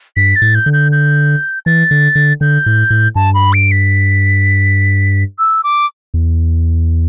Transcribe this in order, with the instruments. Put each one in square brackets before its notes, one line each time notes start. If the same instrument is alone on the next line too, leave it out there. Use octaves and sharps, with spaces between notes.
[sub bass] G2 [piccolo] B6
[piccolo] A6
[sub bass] A2
[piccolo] G6
[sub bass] D3
[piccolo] G6
G6
[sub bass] E3 [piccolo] A6
[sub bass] D3
D3
[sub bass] D3 [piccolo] G6
[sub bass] A2
A2
[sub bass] G2 [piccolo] A5
[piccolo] B5
D7
B6
E6
D6
[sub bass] E2